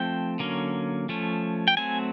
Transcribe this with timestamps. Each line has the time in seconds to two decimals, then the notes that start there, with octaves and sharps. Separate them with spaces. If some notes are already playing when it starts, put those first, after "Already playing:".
Already playing: F3 A3 C4 G5
0.39 D3 F#3 A#3 C#4
1.09 F3 A3 C#4
1.68 G5
1.77 F#3 A3 C4 G#5